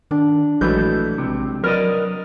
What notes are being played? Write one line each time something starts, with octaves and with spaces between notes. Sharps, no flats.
D#3 D4
A#1 E3 F#3 G#3 A3 B4 G6
C#2 C3
F#3 A#4 B4 D5 D#5 F6